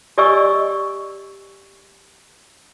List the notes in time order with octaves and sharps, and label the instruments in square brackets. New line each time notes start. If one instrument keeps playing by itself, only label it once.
[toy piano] G4 D5 D#5 G#5 C#6 E6